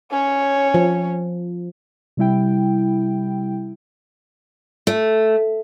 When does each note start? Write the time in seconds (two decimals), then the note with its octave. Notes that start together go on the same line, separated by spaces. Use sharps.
0.11 C#4 C#5
0.74 F3
2.17 C3 G3 E4 G5
4.87 A3